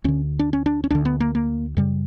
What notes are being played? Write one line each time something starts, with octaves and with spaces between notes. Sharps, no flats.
D2 D3 C#4
D4
C#4
D4
C#4
D2 D3 D4
B3
A#3
A#3
F#2 C#3 G3